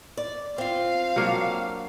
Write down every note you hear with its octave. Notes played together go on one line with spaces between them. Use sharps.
D5
C4 F4 F5
F#3 A#3 D4